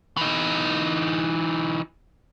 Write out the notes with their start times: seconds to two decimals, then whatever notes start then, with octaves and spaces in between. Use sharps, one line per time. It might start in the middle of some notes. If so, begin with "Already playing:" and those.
0.17 E3 D#4